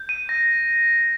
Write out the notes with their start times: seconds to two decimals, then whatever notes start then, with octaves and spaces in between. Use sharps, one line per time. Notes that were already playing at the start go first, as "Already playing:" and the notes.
Already playing: G6
0.09 D#7
0.29 A#6